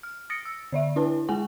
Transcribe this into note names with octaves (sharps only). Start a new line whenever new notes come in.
F6
D#6 A6 A#6 C#7 D7
E6
D3 D5 E5
D4 E4 B4 A5
G#3 G#4 G5 G#5 C#6